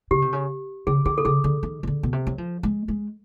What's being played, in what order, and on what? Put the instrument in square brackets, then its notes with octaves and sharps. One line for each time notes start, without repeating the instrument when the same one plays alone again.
[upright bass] C#3 [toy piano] G4
[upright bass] C3
C#3
[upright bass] C#3 [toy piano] G#4
[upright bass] D3 [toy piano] G#4
[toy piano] A4
[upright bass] C#3 [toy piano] G#4
[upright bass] D3
D#3
D#3
D3
B2
C3
F#3
F3
G#3
G#3